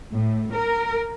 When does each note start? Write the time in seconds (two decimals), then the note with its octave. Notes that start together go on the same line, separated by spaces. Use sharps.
0.13 A2
0.54 A#4